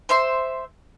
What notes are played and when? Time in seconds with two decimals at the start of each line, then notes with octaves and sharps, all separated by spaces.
0.09 C5 E5 C6